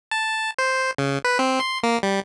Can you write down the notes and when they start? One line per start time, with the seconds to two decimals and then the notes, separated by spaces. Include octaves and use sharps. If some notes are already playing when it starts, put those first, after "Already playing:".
0.11 A5
0.59 C5
0.98 C#3
1.24 B4
1.39 C4
1.60 C6
1.83 A#3
2.03 G3